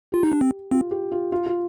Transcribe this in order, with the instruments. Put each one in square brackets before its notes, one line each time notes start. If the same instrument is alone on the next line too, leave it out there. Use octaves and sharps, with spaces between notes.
[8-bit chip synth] F4 [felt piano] G4
[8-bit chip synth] D#4
D4
C4
[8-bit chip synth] C4 [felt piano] F4
[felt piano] G4
F4
F4
F4